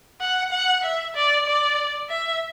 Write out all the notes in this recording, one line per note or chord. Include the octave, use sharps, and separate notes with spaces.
F#5
F#5
E5
D5
D5
E5